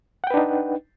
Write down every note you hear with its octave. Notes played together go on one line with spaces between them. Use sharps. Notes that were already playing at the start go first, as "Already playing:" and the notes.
D4 D#4 B4 F#5 G5